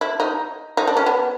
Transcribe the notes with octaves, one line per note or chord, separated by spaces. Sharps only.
E4
D#4
D#4
D4
C#4
B3